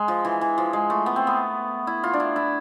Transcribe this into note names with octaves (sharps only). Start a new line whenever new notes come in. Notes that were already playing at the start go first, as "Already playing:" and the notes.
Already playing: G#3
F3
E3
E3
F3
G#3
A3
B3
C4
B3
E4
F4
D4
E4
E4